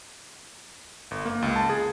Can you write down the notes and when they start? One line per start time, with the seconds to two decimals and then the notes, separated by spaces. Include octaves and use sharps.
1.11 G1
1.25 A#3
1.42 C#2
1.56 A5
1.69 G#4